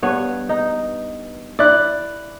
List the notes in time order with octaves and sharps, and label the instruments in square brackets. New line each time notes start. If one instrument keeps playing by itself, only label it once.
[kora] G2 B3 C#5
D#4
[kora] E4 [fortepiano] D5 F#6